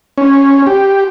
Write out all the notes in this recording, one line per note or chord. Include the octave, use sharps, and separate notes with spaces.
C#4
G4